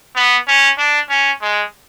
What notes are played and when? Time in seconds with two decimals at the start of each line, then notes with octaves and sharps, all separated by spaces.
0.16 B3
0.48 C#4
0.78 D4
1.10 C#4
1.42 G#3